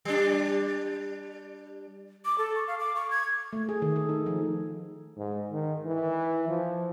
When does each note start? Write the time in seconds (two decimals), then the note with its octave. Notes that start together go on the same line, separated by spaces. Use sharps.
0.05 G3 D4
2.25 D6
2.38 A4
2.56 C#6
2.68 F5
2.80 D6
2.95 C#6
3.11 G#6
3.53 A3
3.69 G#4
3.82 D#3
3.96 A4
4.09 D#4
4.26 F3
5.18 G#2
5.52 D#3
5.85 E3
6.49 F3